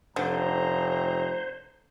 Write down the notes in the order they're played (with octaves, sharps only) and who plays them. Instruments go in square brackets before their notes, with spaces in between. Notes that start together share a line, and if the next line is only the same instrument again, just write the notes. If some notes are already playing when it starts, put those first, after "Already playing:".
[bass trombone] F1 [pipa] D3 [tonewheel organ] C5 [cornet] A#5